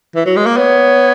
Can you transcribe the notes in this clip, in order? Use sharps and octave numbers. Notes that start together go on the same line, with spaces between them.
E3
F#3
G#3
A#3
B3 C#5